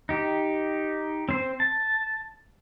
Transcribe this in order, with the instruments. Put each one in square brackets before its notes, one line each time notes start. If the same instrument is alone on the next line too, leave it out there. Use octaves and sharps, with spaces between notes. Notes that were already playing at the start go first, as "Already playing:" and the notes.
[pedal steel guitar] D#4 G4
C4 C5
A5